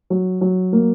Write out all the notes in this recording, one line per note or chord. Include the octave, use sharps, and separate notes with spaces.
F#3
F#3
A#3